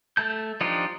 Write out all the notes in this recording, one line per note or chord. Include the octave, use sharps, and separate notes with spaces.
A3 A5 G6
F3 D4 D#4 F4 G4